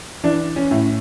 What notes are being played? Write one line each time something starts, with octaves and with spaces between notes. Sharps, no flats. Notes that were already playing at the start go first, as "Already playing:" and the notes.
E3 D4
C#4
A2